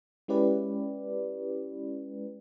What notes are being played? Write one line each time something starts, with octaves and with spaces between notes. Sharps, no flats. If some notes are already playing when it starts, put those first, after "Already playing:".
G#3 C#4 E4 G4 B4 D5